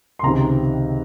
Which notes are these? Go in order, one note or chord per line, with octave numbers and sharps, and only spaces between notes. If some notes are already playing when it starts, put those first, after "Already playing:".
C6
C#2 C3 D#3 A#5